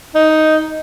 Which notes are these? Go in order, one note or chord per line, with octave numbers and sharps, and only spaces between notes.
D#4